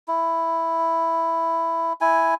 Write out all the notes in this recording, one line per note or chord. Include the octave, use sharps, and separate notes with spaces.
E4
E4 G#5